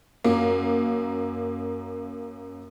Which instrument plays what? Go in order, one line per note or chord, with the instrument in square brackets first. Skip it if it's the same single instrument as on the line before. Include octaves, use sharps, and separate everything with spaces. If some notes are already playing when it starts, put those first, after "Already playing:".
[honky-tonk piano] F#2 A#3